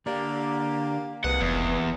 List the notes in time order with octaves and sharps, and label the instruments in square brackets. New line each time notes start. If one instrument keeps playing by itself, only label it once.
[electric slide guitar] D3 D5 [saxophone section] A#3 G4
[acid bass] C2 [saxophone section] C3 G#3 A#3 [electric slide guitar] B4 [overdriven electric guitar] F#5
[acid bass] F1 [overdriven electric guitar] E2